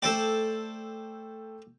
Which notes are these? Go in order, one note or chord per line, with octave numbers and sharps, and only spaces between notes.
A3 A4 C5 D5 G5